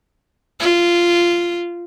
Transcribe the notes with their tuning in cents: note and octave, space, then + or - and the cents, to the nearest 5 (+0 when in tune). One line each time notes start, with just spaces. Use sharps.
F4 -10